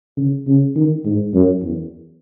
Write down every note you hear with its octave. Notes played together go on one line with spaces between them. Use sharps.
C#3
C#3
D#3
G#2
F#2
E2